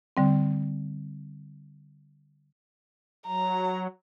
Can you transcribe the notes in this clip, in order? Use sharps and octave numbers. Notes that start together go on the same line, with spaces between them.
D3 G3 C4
F#3 A#5